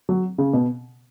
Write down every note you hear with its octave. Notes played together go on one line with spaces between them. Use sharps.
F#3
C#3
B2